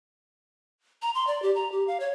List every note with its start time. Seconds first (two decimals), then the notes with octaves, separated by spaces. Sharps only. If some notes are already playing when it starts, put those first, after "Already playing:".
1.02 A#5
1.15 C6
1.27 D5
1.42 G4
1.55 A#5
1.72 G4
1.87 F5
2.00 C#5